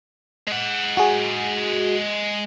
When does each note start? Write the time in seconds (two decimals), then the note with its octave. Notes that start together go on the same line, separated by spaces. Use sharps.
0.48 G#3 F#5
0.97 F#4 G#4